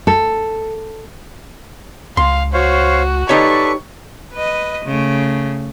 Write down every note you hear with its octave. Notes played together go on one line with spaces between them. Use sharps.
A4
C#2 F5 C6
F#4 C5 C#5 F5
D#4 G4 A4 B4 C#5 D5 C#6
B4 D#5
C#3 A3